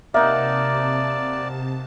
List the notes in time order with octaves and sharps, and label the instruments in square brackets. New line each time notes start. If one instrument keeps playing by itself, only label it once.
[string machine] C3 A5 [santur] A#3 D#4 F#5 [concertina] D5 [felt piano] E5